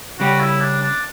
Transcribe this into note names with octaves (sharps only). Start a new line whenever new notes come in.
C#3 G3 C#4 F#4 G4
E4
D4
D4